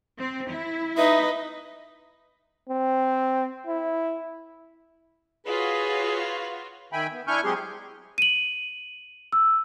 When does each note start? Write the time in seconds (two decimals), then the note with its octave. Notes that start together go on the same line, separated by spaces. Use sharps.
0.18 C4
0.50 E4
0.97 D#4 B4 D#5 E5
2.69 C4
3.67 E4
5.47 F4 F#4 G#4 B4 C#5
6.93 D#3 E5 G5 G#5 B5
7.12 B3
7.27 D4 E4 G#5 C#6 F6 G6
7.44 F#3 G#3 C4 G4 G#4 C6
8.18 D#7 F#7
9.32 E6